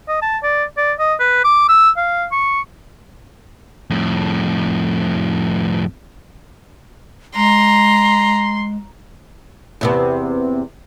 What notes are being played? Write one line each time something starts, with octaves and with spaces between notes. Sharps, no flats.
D#5
A5
D5
D5
D#5
B4
D6
E6
F5
C#6
F2 A2
G#3 A#5 C6
E2 C3 B3